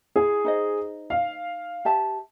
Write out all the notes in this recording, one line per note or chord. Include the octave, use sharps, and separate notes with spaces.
E4 G#4
D#4 C5 D#5
F5
G4 E5 A5